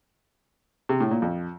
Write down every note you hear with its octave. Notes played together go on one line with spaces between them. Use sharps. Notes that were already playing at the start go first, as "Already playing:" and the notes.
C3
A2
A#2
F2